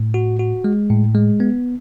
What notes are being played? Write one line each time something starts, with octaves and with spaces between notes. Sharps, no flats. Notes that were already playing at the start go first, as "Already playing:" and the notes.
Already playing: A2
F#4
F#4
G#3
A2
G#3
B3